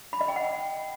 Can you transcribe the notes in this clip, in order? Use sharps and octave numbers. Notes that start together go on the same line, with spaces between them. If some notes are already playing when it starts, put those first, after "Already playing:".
B5
D#5
G5
F#5